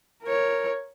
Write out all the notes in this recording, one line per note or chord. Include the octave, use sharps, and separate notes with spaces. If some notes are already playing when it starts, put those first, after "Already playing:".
A#4 C#5